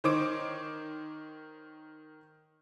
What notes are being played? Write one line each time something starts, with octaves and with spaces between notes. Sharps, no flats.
D#3 C5 C#5 D6 D7